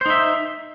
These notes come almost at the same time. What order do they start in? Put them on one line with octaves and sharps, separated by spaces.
C5 D#4 E5